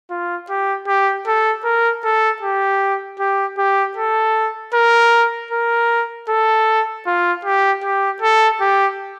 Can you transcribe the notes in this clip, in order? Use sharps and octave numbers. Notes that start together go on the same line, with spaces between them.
F4
G4
G4
A4
A#4
A4
G4
G4
G4
A4
A#4
A#4
A4
F4
G4
G4
A4
G4